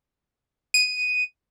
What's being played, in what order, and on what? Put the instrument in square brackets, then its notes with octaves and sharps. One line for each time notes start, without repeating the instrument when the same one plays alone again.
[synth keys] D#7